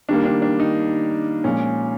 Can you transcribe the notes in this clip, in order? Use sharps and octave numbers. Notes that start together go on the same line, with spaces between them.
D#3 G3 A#3 D4
D4
D4
D#4
A#2 F3 G#3 C#4